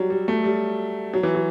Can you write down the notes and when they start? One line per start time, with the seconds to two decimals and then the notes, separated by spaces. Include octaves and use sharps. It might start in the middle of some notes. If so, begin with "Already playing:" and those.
Already playing: F#3 G3
0.10 G3
0.28 A3
0.44 G3
1.14 F#3
1.23 E3
1.35 F#3